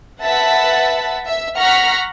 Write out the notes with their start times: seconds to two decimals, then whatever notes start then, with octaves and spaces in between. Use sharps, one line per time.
0.22 B4 E5 F#5 A5 B5 B6
1.27 E5
1.57 F#5 A#5 C#6 F6 A#6 B6